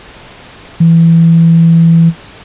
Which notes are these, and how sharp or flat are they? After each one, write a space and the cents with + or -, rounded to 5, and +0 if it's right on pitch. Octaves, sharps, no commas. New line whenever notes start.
E3 +10